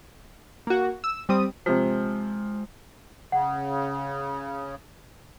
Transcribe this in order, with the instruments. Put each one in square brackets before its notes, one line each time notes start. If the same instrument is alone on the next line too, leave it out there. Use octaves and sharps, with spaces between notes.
[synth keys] A#3 F#4
E6
G3 C4 D#6
[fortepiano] C3 F3 [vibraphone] G#3
[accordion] C#3 [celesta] F#5